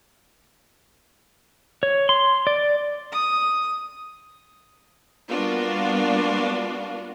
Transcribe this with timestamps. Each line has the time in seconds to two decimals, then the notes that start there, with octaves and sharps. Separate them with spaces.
1.83 C#5
2.09 C6
2.47 D5
3.12 D#6
5.29 G3 A#3 B3 D4 F4 F#4